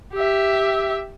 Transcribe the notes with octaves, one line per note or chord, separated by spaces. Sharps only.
G4 E5